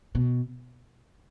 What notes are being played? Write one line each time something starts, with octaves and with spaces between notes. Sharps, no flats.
B2